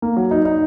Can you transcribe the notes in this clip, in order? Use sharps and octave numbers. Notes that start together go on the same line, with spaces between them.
A#3
F#3
D#4
D#4